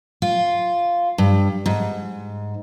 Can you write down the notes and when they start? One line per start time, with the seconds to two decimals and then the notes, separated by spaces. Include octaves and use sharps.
0.22 F4
1.18 G2
1.66 G#2